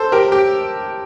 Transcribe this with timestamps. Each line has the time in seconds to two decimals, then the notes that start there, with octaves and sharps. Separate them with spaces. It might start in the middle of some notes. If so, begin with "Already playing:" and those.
Already playing: A4 C5
0.12 G4 A#4
0.32 G4